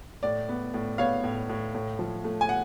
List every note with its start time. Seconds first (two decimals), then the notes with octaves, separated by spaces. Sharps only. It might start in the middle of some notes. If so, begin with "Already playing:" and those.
0.23 A2 D5
0.49 B3
0.74 A2
0.98 B3 C#5 F5
1.24 A2
1.49 A2
1.75 A2
1.99 F3
2.24 A3
2.41 G#5
2.49 F#5